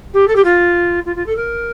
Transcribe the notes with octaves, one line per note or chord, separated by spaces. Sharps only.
G4
A4
G4
F4
F4
F4
A4
A#4